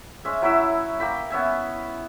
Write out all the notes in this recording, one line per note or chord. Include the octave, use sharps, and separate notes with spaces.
G#3 C#4 E5
F#3 E4 B5 E6
A#3 G5 B5
B3 C#4 E5 G#5